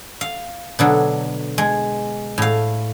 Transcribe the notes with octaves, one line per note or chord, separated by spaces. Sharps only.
F5
B2 D3 F#3
G#3
A2 F5